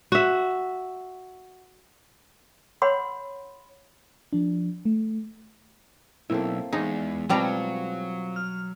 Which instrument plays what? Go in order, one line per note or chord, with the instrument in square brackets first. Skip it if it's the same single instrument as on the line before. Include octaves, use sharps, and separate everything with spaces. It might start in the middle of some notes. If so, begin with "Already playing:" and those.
[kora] F#4 E5
[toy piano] C#5 F#5 B5 C6
[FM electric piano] F3 D4
A3
[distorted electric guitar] B1 [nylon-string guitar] A#3 C4 A4 [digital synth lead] E4
[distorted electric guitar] E2 [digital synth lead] G#3 [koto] D#4
[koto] B2 G3 A#5 [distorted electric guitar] F#3 [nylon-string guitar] C4 E4 F4
[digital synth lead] F6